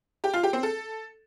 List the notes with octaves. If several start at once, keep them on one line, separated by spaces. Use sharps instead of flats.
G4
F4
G4
C4
A4